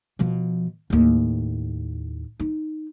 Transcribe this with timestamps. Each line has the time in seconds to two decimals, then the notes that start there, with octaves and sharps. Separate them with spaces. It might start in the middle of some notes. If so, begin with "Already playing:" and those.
0.19 B2 F3
0.90 D#2 A2
2.40 D#4